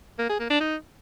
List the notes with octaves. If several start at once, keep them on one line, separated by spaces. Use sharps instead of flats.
A#3
G#4
A#3
D4
D#4